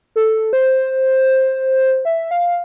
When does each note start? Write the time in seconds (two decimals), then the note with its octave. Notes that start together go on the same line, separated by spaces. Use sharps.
0.16 A4
0.53 C5
2.05 E5
2.31 F5